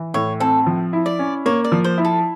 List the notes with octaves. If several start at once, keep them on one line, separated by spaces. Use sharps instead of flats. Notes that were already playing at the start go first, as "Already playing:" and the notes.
Already playing: E3
A2 C#5
C4 A4
F3
E4
D5
C#4
A#3 C#5
D5
F3
C5
E4
A4